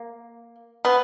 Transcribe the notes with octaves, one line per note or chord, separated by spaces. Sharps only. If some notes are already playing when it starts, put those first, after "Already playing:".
Already playing: A#3
B3